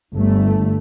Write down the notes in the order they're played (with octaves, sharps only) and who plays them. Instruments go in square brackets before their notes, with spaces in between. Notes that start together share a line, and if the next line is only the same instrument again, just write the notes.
[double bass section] G1 A3